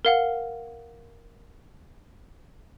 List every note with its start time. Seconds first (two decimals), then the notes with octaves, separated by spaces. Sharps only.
0.05 A#4 F5 F#5